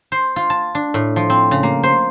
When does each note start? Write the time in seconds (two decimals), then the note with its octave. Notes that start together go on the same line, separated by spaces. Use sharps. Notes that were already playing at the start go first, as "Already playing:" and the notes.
0.12 C5
0.36 F4
0.50 A5
0.75 D4
0.94 A2
1.16 F3
1.30 C4
1.51 C#3
1.63 A#3
1.83 C5